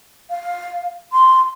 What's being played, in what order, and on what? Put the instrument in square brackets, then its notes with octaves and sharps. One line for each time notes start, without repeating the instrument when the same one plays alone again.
[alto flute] F5
C6